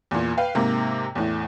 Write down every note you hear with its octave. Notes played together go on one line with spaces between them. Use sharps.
E2 A#2
B4 F5 G5
G#2 C3 A#3
E2 A2